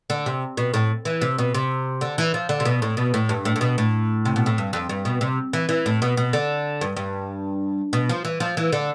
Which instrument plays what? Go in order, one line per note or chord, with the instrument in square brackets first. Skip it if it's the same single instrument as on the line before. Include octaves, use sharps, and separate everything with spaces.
[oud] D3
C3
B2
A2
E3
C3
B2
C3
D3
E3
F3
D3
C3
B2
A2
B2
A2
G2
A2
A2
B2
A2
C3
B2
A2
G2
F2
G2
B2
C3
E3
E3
A2
B2
B2
D3
G2
G2
B2
F3
E3
F3
E3
D3